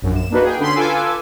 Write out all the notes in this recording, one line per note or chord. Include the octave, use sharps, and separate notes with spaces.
A#1 F#2
E7
A#3 D4 D#4 F#4 B4
G#4 G5
D3 C#4 B5 C6
F4 A4 B4 G#5 D6 E6